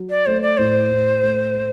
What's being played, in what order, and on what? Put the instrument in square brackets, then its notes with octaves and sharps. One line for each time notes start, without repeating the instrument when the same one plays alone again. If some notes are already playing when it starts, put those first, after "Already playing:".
Already playing: [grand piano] F#3
[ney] D5
[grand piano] A3 [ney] C5
[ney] D5
[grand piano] A2 [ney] C5
[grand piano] A2
A3
A3